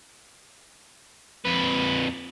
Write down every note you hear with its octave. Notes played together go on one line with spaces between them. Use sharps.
F2 B4